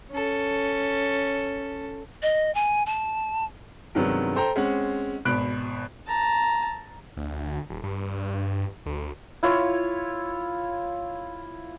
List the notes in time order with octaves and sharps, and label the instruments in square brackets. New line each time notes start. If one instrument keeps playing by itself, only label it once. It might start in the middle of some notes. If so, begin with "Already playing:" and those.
[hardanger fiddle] C#4 A4
[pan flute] D#5
G#5
A5
[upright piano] G2 C3 D#3 F#3 G#3 B3
A4 C5 G5 A#5
G#3 C4 C#4 F#5
G#1 B2 B5 F#6 D7
[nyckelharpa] A5 A#5
[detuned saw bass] D2
D#1
G2
D2
[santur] E4 F4 C#5